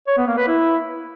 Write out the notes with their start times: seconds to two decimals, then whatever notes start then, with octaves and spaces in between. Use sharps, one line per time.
0.07 C#5
0.17 B3
0.27 A#3
0.37 B4
0.47 E4